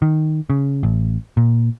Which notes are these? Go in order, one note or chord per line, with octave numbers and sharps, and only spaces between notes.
D#3
C#3
A1
A#2